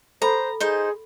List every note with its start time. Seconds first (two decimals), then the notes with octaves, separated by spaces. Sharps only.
0.22 A4 C5 G#5 A#5 B5
0.60 D#4 G#4 C5